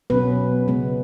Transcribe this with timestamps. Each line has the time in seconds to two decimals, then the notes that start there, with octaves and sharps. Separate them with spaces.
0.10 B2 F#3 B3 C#4 B4
0.68 C#3 G#3 B3